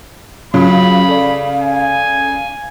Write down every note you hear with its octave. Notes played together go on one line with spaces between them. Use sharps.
C#3 F#3 F4 F5 B5
A4 D5
G#5